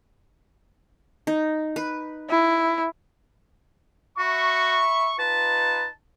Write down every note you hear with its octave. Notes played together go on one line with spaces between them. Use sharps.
D#4
B4
E4
F#4 E5 B5 C#6
D#4 F4 B4 A5